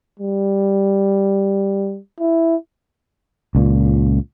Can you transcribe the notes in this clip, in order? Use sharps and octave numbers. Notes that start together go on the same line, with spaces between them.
G3
E4
C#2 A#2